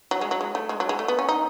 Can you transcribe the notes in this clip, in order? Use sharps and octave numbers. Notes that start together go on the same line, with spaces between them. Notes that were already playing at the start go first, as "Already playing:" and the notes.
F#3
G#3
F#3
G#3
A3
G#3
F#3
G#3
A3
B3
C#4
D#4